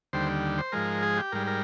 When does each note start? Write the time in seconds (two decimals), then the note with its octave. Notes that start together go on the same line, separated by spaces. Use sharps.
0.13 D#2 D3 G3 C5
0.58 C5
0.72 G#2 F3 G#3 A#4
1.03 G#4
1.17 G4
1.32 G#2 G3 A#4
1.47 A#4